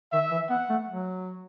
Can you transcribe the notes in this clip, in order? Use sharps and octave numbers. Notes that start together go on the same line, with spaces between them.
D#3 E5
E3
B3 F#5
A3
F#3